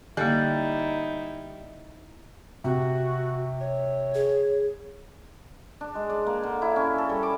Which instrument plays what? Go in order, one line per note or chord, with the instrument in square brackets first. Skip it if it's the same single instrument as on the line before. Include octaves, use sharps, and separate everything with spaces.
[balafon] D3 A#3 [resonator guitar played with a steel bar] G3 [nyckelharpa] D#4 E4
[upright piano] C3 [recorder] F#4
[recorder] C#5
[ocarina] G#4
[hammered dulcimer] D4
G#3
D5
A#3
D3
E4
C#4
A4
G3
D6